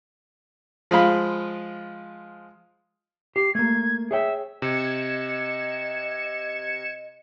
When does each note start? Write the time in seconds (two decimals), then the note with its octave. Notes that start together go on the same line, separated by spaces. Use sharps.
0.91 F3 G#3 F4 B5
3.36 G4 C7
3.55 A3 A#3 G#6
4.11 G#4 C#5 E5 G5
4.62 C3 D#5 G#6 C#7 E7